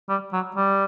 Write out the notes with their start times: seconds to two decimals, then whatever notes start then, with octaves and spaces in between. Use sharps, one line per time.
0.09 G3
0.33 F#3
0.56 G3